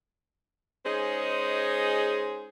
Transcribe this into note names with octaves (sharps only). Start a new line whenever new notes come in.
G#3 C#4 D#4 G#4 C5